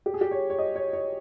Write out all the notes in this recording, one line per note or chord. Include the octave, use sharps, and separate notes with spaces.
G4
G#4
G4
C#5
C#5
D#5
C#5
C#5